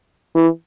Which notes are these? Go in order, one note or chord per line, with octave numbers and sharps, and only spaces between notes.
E3